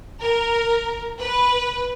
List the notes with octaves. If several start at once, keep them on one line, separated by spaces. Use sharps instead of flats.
A#4
B4